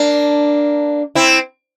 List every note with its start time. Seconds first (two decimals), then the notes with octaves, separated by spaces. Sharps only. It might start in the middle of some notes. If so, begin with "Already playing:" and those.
Already playing: A#3 D4
1.15 C4 E4